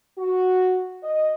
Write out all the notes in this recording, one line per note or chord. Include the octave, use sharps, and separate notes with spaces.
F#4
D#5